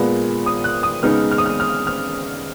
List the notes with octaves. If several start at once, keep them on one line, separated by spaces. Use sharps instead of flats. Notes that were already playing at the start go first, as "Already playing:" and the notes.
Already playing: A#2 G#3 B3
D#6
F#6
D#6
C#3 G#3 B3 D#4 F6
F6
D#6
F6
F6
F6